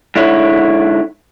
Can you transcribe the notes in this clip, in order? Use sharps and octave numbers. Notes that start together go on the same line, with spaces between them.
G#2 D3 E4 C#5